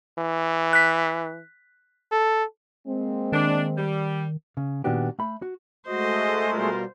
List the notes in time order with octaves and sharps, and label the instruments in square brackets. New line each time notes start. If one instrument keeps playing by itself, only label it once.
[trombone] E3
[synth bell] F#6 B6
[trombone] A4
[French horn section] G#3 A#3 C4
[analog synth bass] D#3 [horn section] D4
[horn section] G3
[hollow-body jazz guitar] C#3
A#2 D#3 B3 D4 F#4 G4
A3 B5
F#4
[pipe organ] G#3 A3 [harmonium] F#4 [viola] C5 [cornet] D#5
[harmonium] B2 G3 F4 [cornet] A#4